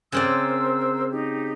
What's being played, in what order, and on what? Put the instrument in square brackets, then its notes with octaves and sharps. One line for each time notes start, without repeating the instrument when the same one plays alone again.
[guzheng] C#3 C4 D5 [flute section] A#4 C5 E6
[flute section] D#4 G4